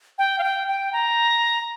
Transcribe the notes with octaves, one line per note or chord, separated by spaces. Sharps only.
G5
F5
G5
G5
A#5